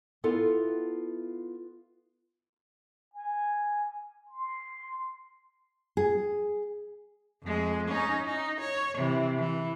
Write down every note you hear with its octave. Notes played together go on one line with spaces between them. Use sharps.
B3 E4 F4 A4 B4
G#5
C6
G#4
F2 G#3
C#4 D#4
D#4
C#5
C3 E3
E3